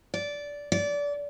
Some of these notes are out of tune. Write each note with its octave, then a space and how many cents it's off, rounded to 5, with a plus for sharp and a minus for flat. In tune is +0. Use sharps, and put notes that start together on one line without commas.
D5 -15
D5 -25